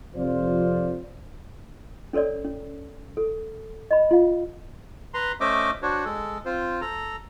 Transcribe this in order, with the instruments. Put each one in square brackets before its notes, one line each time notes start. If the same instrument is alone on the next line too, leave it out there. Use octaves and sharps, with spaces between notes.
[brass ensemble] F2 C3 F3 F4 C5 D5
[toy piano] C#4 A4 A#4 C#5 D5
C#4
A4
D#5 B5
F4 F5
[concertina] B4 A#5 C6
A3 C#4 C5 D#5 E5 D6
D4 F#4 C5 C#5
G#3 A4
C4 F4 C5
A4 A#5